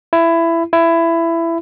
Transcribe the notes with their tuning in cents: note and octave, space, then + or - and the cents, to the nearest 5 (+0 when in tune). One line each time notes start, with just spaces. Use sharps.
E4 +20
E4 +20